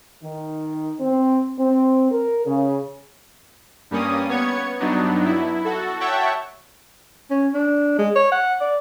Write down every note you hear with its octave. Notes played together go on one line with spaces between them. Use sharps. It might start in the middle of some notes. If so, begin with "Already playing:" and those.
D#3
C4
C4
A#4
C#3
G2 G3 A#3 C#4 D#6
B3 C#5 G#6 C#7
G2 F#3 B3 D4 D#4
E4
F#4 A4
C#5 E5 F#5 G5 A5 C#6
C#4
D4
G#3
C#5
F#5
D5